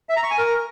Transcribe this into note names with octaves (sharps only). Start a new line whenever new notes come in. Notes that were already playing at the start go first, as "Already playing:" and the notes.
E5
A#5
C#6
G#5
A#4